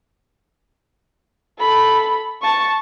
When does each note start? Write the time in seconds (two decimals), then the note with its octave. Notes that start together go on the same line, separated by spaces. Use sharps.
1.60 A4 B5
2.42 A5 C#6